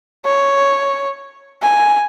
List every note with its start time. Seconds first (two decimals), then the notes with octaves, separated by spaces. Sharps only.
0.25 C#5
1.62 G#5